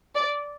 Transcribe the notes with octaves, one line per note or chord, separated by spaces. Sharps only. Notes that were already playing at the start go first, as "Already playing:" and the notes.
D5